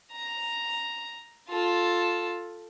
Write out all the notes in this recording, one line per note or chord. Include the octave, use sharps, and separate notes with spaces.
A#5
F4 A4